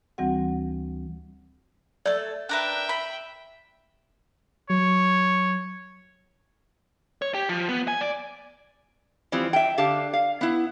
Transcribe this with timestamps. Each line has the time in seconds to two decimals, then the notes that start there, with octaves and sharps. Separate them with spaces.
0.18 D2 E3 G3 C4 F#4 F#5
2.06 A3 A4 D5
2.49 D4 A#4 B4 E5 G5
2.89 B5
4.70 F#3 C#5
7.22 C#5
7.34 G4
7.49 F3
7.69 B3
7.88 G#5
8.01 D5
9.32 E3 F3 G3 C4
9.53 E5 G5
9.78 D3 G4 F5 A5
10.13 F5
10.41 B3 E4